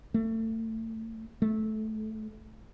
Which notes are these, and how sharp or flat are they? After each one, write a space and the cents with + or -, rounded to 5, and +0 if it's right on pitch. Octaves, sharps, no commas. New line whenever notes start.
A3 +30
A3 -15